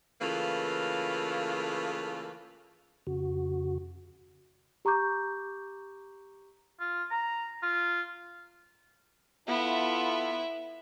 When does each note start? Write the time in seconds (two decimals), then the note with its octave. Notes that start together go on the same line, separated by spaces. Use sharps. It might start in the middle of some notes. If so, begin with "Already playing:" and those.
0.22 C#3 E3 A3 A#3 F4 B4
3.07 F2 C#3 F#4
4.85 G4 A#5 C#6 D6 G6
6.80 F4
7.11 A#5
7.62 F4
9.48 B3 E4 F4 A4 E5